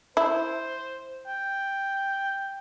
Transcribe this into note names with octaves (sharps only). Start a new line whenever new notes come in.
E4 C5
G5